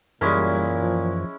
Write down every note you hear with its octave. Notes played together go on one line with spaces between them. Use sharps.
F#2 A#2 E3 G3 G#3 C#4 E4 A#4
F3